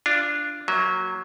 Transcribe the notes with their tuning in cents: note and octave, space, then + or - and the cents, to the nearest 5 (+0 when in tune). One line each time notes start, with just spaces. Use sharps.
D4 +0 F4 -20
F#3 +0 A#3 +0 E5 -30